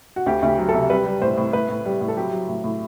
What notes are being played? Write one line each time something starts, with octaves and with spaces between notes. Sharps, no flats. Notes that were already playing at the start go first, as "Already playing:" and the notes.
F#4
D2 G4
D2
G4
F#3
A4
C3
G3 B4
G3
A2 C5
A2
A2 B4
A2
G3
A2
A4
F#3 G4
F#3
A2
A2